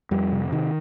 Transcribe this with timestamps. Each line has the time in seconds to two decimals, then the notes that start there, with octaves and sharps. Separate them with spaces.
0.11 F2 G3
0.32 C3
0.52 C3 D#3